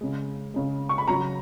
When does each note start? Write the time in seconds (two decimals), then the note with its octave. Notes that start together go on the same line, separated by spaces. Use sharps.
0.01 C#3 G#3
0.54 C#3 G#3
0.89 C#6
0.98 B5
1.08 C#3 F#3 A#5